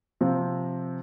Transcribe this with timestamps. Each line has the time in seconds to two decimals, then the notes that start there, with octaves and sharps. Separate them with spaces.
0.21 C3 F3 C4